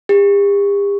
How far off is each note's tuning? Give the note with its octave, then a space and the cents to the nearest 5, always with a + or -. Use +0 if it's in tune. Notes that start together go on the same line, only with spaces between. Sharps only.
G4 +45